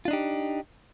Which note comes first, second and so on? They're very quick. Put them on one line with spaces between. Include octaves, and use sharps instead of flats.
F4 D4 D#4 G4